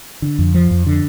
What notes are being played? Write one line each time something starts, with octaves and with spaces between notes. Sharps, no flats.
D3
F2
F3
F2
D3